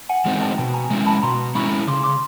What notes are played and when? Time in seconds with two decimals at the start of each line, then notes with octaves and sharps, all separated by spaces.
0.09 F#5 G#5
0.26 E3 G#3 C4 D#4
0.42 G5 A5
0.58 B2 G5 A5
0.74 G#5 A#5
0.90 G#3 C#4 E4
1.06 A5 B5
1.22 B2 A#5 C6
1.55 G#3 C#4 E4 B5 C#6
1.87 C#3 C6 D6
2.04 C6 D6